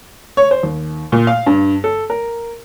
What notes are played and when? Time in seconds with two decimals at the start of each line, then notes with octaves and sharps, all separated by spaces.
0.37 C#5
0.51 C5
0.63 D#2
1.12 A#2
1.27 F5
1.46 G2
1.84 A4
2.10 A#4